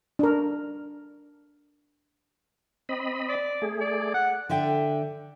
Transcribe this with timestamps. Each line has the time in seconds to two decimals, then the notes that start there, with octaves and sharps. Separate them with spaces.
0.19 D4 A#4
2.89 C4 D#5 B5
3.29 D5
3.62 A3 G#4
3.81 D5
4.14 F#5
4.49 D3 D5 E5 G5